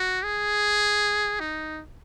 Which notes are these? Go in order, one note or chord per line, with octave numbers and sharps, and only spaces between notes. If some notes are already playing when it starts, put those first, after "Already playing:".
Already playing: F#4
G#4
D#4